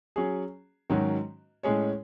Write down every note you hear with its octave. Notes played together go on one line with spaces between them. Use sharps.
F#3 C#4 G#4
G#2 D#3 F#3 C#4 F#4
A2 G#3 C#4 G#4 C#5